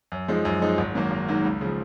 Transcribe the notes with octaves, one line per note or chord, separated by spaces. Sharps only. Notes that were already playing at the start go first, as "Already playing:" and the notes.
F#2
F3 G#3 D#4
F#2
F3 G#3 D#4
G#1
G#2 D#3 F#3 A#3
G#1
G#2 D#3 F#3 A#3
C#2
C#3 F3